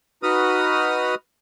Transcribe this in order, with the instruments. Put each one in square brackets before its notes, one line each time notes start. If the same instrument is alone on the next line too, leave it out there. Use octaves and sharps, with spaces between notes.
[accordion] D#4 F#4 B4 D#6 F6